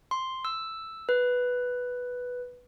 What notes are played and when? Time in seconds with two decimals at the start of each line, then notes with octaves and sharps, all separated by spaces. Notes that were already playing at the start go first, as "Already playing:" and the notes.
0.11 C6
0.45 E6
1.09 B4